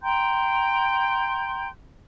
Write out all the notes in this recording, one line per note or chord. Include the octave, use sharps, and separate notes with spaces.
G5 A#5 C6 G6